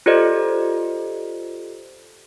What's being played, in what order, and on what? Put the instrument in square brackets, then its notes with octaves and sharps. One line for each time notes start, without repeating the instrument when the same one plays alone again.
[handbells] F4 G4 A4 C5 D5 D#5